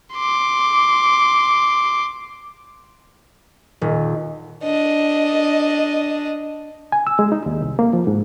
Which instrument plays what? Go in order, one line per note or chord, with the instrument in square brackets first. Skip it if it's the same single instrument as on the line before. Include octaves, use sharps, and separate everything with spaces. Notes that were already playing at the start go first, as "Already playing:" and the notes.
[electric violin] C6 D6
[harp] D#1
[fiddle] D4 D#5
[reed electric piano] G#5
E6
G#3
D#4
D#2
C2
A#3
F3
G#2